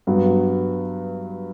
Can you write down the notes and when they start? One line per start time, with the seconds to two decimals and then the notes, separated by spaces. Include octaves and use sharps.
0.07 G2 F#3 B3